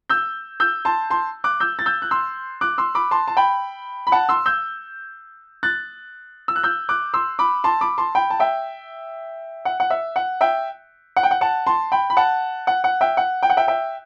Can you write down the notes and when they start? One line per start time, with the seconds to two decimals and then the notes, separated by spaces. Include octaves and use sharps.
0.10 E6 G6
0.60 E6 G6
0.85 A5 C6
1.10 A5 C6
1.44 D6 F#6
1.60 E6 G6
1.79 A6
1.86 E6 G6
2.02 F#6
2.11 C6 E6
2.61 D6 F#6
2.78 C6 E6
2.95 B5 D6
3.11 A5 C6
3.28 A5
3.37 G5 B5
4.07 B5
4.12 F#5 A5
4.29 C6 E6
4.46 E6 G6
5.63 F#6 A6
6.48 E6
6.56 F#6
6.63 E6 G6
6.89 D6 F#6
7.14 C6 E6
7.39 B5 D6
7.64 A5 C6
7.81 B5 D6
7.98 A5 C6
8.15 G5 B5
8.30 A5
8.40 E5 G5
9.65 F#5
9.80 F#5
9.90 E5
10.16 F#5
10.41 E5 G5
11.16 F#5
11.23 G5
11.31 F#5
11.41 F#5 A5
11.67 A5 C6
11.92 G5 B5
12.10 B5
12.17 F#5 A5
12.67 F#5
12.84 F#5
13.01 E5 G5
13.17 F#5
13.43 G5
13.50 F#5
13.57 E5 G5
13.68 E5 G5